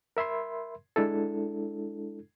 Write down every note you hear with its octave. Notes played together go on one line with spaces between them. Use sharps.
A#4 E5 B5 C6
G#3 D4 E4 A4